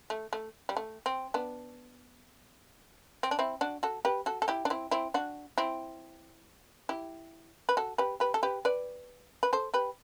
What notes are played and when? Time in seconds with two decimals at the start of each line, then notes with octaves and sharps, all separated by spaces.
0.10 A3
0.33 A3
0.69 G3
0.77 A3
1.06 C4
1.34 B3 D4
3.23 C4
3.31 D4
3.39 C4 E4
3.61 D4 F#4
3.83 F#4 A4
4.05 G4 B4
4.26 F#4 A4
4.42 A4
4.48 E4 G4
4.65 D4
4.70 C4 E4
4.91 C4 E4
5.14 D4 F#4
5.58 C4 E4
6.89 E4 G4
7.69 B4
7.77 F#4 A4
7.98 G4 B4
8.20 G4 B4
8.34 A4
8.43 G4 B4
8.65 B4 D5
9.43 B4
9.53 A4 C5
9.74 G4 B4